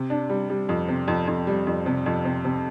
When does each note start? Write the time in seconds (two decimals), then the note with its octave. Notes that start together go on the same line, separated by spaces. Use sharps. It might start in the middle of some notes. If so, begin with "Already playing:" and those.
Already playing: C3
0.10 D4
0.29 G3
0.49 G3
0.69 F2
0.88 C3
1.08 F2
1.28 F2
1.47 G3
1.67 F2
1.86 C3
2.06 F2
2.25 C3
2.45 C3